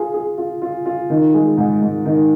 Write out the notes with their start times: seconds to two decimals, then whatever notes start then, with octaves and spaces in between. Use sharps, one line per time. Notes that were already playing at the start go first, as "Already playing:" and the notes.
Already playing: F4 G#4
0.14 G#4
0.38 F4
0.62 F4
0.86 F4
1.10 D#3
1.34 G#3
1.57 G#2
1.81 G#2
2.05 D#3